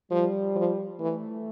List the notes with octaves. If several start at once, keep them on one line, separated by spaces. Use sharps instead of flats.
F3 G3
F3
E3 A3